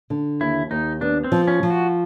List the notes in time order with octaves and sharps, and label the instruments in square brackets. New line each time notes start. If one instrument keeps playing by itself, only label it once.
[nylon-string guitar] D3
[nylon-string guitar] D#2 [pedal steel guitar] E4
[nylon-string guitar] D#2 [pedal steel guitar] D#4
[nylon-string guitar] B3 [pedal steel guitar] D4
[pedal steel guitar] C4
[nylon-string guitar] F3
[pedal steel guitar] C#4
[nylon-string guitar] F3
[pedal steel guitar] F#4